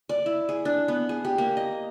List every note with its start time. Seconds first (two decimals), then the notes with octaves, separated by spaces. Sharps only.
0.09 D5
0.26 E4
0.49 G#4
0.65 D4
0.88 B3
1.09 G#4
1.25 G4
1.38 A#3
1.57 D#5